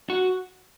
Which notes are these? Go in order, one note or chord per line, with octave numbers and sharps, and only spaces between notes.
F#4